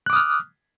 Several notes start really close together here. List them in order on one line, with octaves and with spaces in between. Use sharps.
F#6 D6 D#6 F6